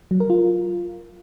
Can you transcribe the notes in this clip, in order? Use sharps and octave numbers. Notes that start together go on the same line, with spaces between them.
F#3
A#4
F4